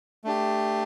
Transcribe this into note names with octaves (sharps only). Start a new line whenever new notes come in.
A3 D4 G4